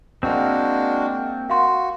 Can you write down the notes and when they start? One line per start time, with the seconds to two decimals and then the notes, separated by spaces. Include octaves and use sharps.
0.23 G#3 A#3 C4 D4 F#4
1.50 F#4 F5 C6